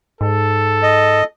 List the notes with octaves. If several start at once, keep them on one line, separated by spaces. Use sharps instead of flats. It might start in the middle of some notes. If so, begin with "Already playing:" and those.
G#2 A4
D#5